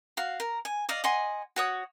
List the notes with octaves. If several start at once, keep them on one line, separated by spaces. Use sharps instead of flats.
F#4 F5
A#4
G#5
D5 D#5 F5
D#5 F#5 G#5 C6
F#4 C#5 D#6